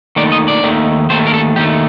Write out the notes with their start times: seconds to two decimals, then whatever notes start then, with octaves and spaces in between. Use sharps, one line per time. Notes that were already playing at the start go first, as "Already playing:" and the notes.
0.16 D#2 D#3 A3 D5
0.32 D#5
0.48 D5
0.63 D#2 D#3 A3
1.10 D#2 D#3 A3 C5
1.27 A#4
1.34 A4
1.56 D#2 D#3 A3 G4